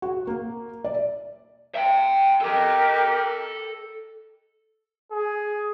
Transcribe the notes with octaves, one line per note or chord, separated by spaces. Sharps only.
F#4
A#3
D5
E5 G5
G4 A4 A#4 D#5
G#4